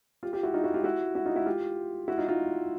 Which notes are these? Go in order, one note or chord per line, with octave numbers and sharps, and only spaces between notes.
F4 G4
F4 G4
E4 F#4
D#4 F4
E4 F#4
F4 G4
E4 F#4
E4 F#4
D#4 F4
E4 F#4
F4 G4
E4 F#4
D#4 F4
D#4 F4